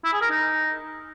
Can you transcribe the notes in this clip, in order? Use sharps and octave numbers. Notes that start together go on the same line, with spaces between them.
E4
G#4
A#4
D#4